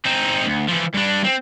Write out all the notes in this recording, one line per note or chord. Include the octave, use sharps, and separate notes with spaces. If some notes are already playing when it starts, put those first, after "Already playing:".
C4 D#4
D2
E3 F3
G2 D4
C4